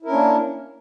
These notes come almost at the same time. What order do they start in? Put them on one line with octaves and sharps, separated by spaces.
E4 A#4 C#4 D4 A#3